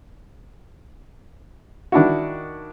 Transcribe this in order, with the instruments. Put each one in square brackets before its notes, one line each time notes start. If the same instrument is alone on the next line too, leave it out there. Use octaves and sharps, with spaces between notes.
[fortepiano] D#3 D4 E4 F#4